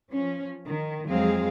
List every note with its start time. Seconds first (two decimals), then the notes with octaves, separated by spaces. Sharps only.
0.12 F3 C#4
0.68 D#3
1.08 F2 F#3 G#3 C4 G#4 F5